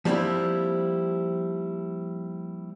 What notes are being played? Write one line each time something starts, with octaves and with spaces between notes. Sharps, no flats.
F3 G3 A#3 C4 E4